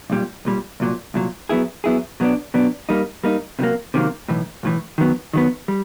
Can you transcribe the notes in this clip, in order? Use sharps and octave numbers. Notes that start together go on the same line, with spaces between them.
B1 A#2 G3
B1 A#2 G3
C2 A#2 F#3
C2 A#2 F#3
F#3 B3 E4 G#4
F#3 B3 E4 G#4
B2 F#3 B3 D4
B2 F#3 B3 D4
G3 A#3 D#4
G3 A#3 D#4
C3 D#3 F#3 A#3
C3 D#3 F#3 A#3
B1 A2 E3
B1 A2 E3
D#3 F#3 B3
D#3 F#3 B3
G3